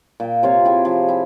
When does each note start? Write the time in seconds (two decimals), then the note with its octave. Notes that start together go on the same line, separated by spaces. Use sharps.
0.20 A#2 G5
0.43 C3 F4 C#5 F5
0.65 E4 G4 G#4
0.85 F3
1.09 E4 G4